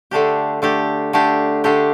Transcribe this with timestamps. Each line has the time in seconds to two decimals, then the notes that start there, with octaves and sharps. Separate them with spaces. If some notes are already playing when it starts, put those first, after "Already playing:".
0.11 D3 A3 D4 G4
0.62 D3 A3 D4 G4
1.13 D3 A3 D4 G4
1.64 D3 A3 D4 G4